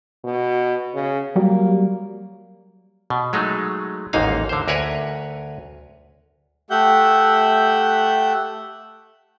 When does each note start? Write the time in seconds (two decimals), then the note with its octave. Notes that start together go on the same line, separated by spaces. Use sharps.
0.24 B2
0.94 C#3
1.36 F#3 G3 A#3 F#4
3.10 B2
3.33 F#3 G#3 A3 D#4
4.13 A1 D#2 G#2 A#3 D#4 F5
4.49 D3 C5
4.68 D2 A#4 B4 C#5 G#5
6.70 A3 G4 E5 F#5 G6